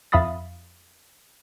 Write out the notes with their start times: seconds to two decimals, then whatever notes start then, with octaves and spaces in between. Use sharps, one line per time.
0.12 F2 E5 F5 B5 D#6 A6